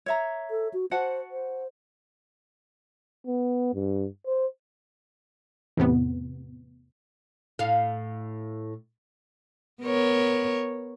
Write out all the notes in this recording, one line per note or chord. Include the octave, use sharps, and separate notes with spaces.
C#5 E5 A#5
A4
F#4
F#4 C5 F#5 A5
C5
B3
G2
C5
E2 A2 C3 B3
A2 F5
B3 A#4 C#5